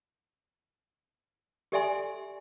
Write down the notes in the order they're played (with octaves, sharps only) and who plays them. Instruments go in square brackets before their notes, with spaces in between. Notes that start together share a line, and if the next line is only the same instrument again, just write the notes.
[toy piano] G4 A4 D5 E5 G#5 C6